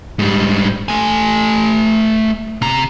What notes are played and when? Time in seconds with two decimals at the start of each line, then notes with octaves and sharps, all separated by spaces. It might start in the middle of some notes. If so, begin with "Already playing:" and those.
0.19 G#2 G3
0.89 A3 G#5
2.62 C3 A#5